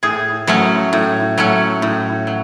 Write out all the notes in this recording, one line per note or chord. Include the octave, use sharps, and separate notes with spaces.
A2 G#4
F#3 A3 C#4
A2
F#3 A3 C#4
A2
F#3